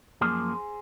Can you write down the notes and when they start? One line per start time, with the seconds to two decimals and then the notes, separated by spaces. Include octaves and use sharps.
0.21 F#2 F3 A#3 G#4 C5